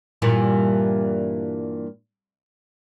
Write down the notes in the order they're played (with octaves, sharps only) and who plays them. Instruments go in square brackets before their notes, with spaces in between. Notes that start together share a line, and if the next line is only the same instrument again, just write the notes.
[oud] G2 A#2 E3